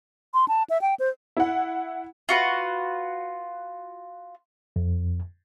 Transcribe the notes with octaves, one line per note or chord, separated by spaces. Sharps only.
C6
A5
E5
G5
C5
E4 F#5
F4 F#4 B4
F2